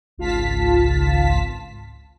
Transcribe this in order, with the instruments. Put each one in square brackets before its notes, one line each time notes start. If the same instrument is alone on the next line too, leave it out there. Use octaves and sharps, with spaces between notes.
[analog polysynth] G#1 C#2 F4 F5 A5 B6